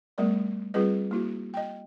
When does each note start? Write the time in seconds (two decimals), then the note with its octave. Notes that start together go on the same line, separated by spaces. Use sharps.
0.18 G3 A3 B3 A#4 D5
0.74 G3 C4 F4 G#4 B4 D#5
1.11 A#3 E4 F#4
1.54 D#5 G5